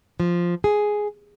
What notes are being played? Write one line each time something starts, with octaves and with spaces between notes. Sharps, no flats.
F3
G#4